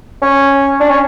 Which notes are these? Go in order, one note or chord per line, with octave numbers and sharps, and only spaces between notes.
C#4
D4
C#4